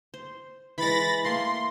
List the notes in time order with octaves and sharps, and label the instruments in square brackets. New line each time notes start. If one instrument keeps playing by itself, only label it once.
[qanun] C5
[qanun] E3 G#3 [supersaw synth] B5 A6 A#6
[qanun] A3 A#3 [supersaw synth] C6